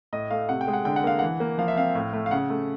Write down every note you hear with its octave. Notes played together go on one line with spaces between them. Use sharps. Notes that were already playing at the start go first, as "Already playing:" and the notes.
A2 D#5
A3 F5
C3 F#5
G5
G#3
F#5
D3 G5
F#5
A#3 F5
E3 F#5
A#3
F3 F5
E5
C4 F5
A2
A3
F5
C#3 F#5
A3